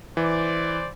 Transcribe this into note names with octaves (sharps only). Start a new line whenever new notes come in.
E3 C5 D5